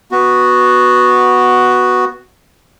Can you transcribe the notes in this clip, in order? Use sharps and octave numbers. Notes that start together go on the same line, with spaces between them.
B3 F#4